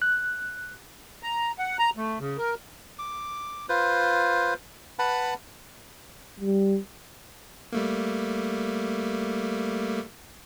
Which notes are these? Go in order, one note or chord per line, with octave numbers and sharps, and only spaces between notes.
F#6
A#5
F#5
A#5
A3
C#3
A#4
D6
F4 B4 C5
B4 F#5 A5 B5
G3
G3 A3 A#3